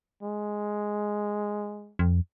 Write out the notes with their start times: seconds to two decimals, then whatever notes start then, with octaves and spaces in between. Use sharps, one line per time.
0.23 G#3
1.99 F2